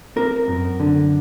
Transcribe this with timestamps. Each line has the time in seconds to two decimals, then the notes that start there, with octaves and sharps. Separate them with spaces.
0.16 C4 A#4
0.48 F#2
0.80 D3